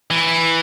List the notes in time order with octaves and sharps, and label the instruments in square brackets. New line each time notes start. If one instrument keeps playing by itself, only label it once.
[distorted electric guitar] E3